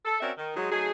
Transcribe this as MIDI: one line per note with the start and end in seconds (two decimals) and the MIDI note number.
0.05 0.16 69
0.20 0.31 60
0.20 0.31 61
0.20 0.31 66
0.20 0.31 70
0.20 0.31 74
0.20 0.31 76
0.37 0.52 51
0.56 0.67 54
0.56 0.67 56
0.56 0.67 63
0.71 0.91 54
0.71 0.91 57
0.71 0.91 63
0.71 0.91 68